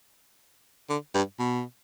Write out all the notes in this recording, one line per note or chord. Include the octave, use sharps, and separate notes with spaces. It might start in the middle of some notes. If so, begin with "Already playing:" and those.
D3
G2
B2